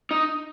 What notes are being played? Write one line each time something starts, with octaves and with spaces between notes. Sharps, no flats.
D#4